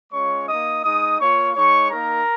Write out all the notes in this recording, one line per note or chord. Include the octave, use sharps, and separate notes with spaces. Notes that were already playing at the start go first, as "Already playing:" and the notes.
G#3 C#4 F4 C#5 C#6
A#3 D#4 D#5 D#6
G#3 D#4 D#5 D#6
A#3 F4 C#5 C#6
G#3 D#4 C#5 C#6
A#3 D#4 A#4 A#5